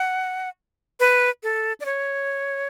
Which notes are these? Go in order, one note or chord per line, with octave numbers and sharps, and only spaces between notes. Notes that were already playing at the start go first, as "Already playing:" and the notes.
Already playing: F#5
B4
A4
D5
C#5